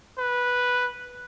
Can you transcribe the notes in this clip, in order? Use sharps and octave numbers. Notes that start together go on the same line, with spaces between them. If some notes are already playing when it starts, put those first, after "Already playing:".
B4